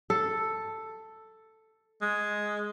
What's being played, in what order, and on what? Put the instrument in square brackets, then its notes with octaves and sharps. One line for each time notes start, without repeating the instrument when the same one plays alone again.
[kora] A4
[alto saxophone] G#3